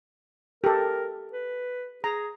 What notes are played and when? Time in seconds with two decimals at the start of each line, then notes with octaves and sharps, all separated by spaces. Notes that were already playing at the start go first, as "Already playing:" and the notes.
0.64 G4 A4 A#4
1.33 B4
2.04 G#4 A#5